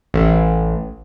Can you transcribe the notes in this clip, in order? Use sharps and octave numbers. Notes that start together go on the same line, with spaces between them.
A1